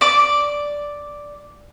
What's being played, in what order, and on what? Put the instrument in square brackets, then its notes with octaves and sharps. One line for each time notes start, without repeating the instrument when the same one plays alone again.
[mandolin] D5 D6